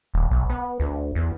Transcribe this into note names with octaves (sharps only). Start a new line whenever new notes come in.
D#1
B1
B3
D2
E2